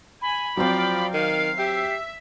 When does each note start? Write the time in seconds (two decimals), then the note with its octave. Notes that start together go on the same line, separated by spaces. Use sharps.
0.22 G#5 B5
0.57 F3 F#3 C4 D5 F5 G5
1.13 D#3 F5 C7
1.58 G4 E5